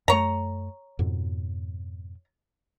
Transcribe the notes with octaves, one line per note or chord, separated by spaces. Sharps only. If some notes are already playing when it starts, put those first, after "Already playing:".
F#2 A3 C#5 A#5
F2 G#2 B2